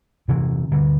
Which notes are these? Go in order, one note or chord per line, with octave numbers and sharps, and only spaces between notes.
E2 C3 E3
D2 D3 G3